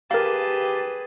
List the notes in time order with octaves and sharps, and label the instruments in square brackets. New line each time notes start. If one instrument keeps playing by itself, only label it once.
[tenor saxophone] G4 [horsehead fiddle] G#4 B4 [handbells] A#4 F5 [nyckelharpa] A5